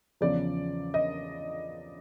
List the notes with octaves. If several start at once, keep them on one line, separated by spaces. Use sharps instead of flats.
E2 C#3 F3 D5
D#5